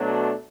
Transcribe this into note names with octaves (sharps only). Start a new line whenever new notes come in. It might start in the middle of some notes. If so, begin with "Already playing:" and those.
Already playing: B2 F#3 A3 D4